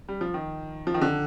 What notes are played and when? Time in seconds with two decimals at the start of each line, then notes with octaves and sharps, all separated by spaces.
0.09 G3
0.21 F3
0.34 D#3
0.87 F3
0.94 D#3
1.02 D3